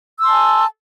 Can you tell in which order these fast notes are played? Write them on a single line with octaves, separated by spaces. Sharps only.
E6 C6 A5 G#5